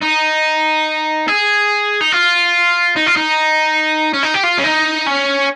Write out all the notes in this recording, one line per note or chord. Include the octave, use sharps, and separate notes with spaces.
D#4
G#4
D#4
F4
D#4
F4
D#4
C#4
D#4
G4
F4
C#4
D#4
C#4